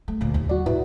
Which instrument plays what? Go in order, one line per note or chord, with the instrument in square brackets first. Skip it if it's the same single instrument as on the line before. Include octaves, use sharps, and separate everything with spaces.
[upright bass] A3
D2 A#2
D#2
[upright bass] F#3 [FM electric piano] F#4 D5
[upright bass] A#2 [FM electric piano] E4 B4